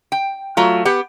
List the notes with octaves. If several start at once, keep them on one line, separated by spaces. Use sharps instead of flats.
G5
F#3 A3 F4
B3 G4 F#5